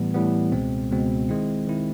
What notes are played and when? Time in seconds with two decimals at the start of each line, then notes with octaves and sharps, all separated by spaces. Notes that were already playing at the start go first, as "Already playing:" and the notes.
Already playing: A2 E3 G3 B3
0.14 A2 E3 G3 B3
0.52 C#2 B2 G#3 C4
0.91 C#2 B2 G#3 C4
1.29 D#3 G#3 C4 E4
1.67 D#3 G#3 C4 E4